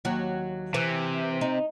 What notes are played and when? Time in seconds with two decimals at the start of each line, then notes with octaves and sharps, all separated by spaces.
0.05 D#2 F#3
0.74 C3 E3
1.41 D#4